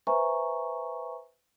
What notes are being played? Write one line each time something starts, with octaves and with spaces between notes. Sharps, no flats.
B4 C5 E5 G#5 A#5 C#6